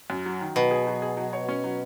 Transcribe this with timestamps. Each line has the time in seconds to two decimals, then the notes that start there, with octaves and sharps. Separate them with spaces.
0.10 F#2
0.26 F#3
0.41 D#3
0.56 B2 F#3
0.71 G#4
0.87 F#3
1.02 G#4
1.17 F#3
1.33 C#5
1.49 C#4
1.64 F#3